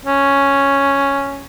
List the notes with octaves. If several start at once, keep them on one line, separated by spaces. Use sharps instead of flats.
C#4